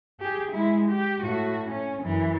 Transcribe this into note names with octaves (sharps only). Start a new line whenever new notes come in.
G4 G#4
G#3 E4
G4
A2 F#4
C#4
F#2 E3